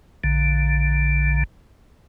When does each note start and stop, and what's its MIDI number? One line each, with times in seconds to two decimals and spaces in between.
0.24 1.43 34
0.24 1.43 50